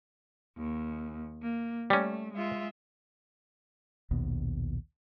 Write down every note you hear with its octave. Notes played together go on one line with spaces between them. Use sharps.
D#2
A#3
G3 A3 C#4
G#3 F4 E5
A#1 D#2 B2